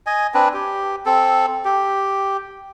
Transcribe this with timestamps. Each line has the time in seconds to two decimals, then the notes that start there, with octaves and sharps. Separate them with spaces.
0.06 D#5 G#5
0.34 C4 D4 B4
0.54 G4
1.06 C4 A4
1.65 G4